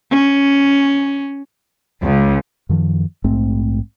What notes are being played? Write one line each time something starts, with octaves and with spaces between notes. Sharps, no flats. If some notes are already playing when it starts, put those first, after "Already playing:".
C#4
C#2
F#2 D#3 F3
A#1 G#2 A3 C4